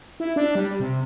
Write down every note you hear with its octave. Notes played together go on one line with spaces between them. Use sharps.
E4
D4
G3
C3